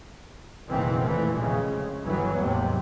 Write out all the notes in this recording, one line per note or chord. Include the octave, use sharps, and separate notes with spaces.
F#1 B2 D#3 E3 C4
F1 A#2 E3 A3
F2 C#3 G#3
G1 E3 F#3 B3
D#2 G#2 C3